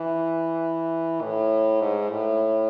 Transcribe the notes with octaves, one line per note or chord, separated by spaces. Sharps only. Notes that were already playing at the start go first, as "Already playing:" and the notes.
Already playing: E3
A2
G#2
A2